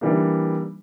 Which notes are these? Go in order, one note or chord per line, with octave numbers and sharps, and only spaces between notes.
E3 G3 A#3 D4